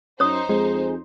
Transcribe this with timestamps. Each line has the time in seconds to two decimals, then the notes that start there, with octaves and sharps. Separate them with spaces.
0.20 F#2 D#4 C5 C#5 D#6
0.49 F2 G#3